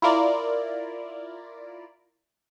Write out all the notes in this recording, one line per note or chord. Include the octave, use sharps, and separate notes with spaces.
E4 F4 A#4 D5